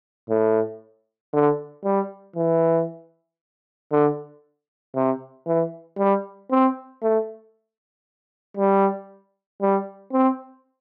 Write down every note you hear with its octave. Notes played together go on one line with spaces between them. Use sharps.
A2
D3
G3
E3
D3
C3
E3
G3
C4
A3
G3
G3
C4